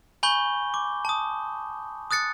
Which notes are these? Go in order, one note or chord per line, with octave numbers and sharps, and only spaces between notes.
G#5 B5 C#6 G6 G7
D6
A5 D#6
D#6 F#6 A6 C#7